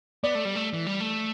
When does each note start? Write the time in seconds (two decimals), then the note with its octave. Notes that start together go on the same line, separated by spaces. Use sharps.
0.24 B3 D5
0.35 A3
0.45 G3
0.55 A3
0.74 E3
0.87 G3
1.00 A3